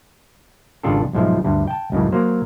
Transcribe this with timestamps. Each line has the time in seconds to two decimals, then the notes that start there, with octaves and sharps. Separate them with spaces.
0.83 G#1 C#3 D4 F4 G4 A4
1.13 B1 G#2 F3 A3
1.44 D2 G2
1.68 G5 A5
1.92 C#2 F#2 A2 C#3
2.12 F#3 A#3 C5